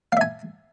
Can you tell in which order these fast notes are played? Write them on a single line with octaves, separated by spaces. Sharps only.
F5 E5 G#5